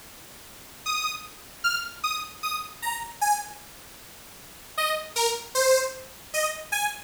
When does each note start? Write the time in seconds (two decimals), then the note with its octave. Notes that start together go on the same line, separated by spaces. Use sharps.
0.86 D#6
1.64 F6
2.04 D#6
2.43 D#6
2.82 A#5
3.21 G#5
4.78 D#5
5.16 A#4
5.55 C5
6.34 D#5
6.72 G#5